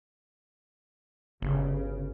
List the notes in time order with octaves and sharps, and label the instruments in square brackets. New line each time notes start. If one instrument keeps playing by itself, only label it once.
[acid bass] G1 [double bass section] C#3